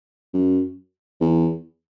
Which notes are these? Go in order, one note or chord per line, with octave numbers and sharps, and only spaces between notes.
F#2
E2